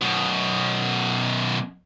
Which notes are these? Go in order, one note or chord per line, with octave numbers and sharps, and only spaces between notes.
F#2 B2